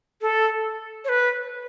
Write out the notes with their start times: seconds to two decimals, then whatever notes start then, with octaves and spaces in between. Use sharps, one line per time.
0.22 A4
1.05 C#5
1.09 B4